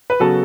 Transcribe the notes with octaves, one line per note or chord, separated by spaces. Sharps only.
B4
C#3 F#3 B3 F#4 A4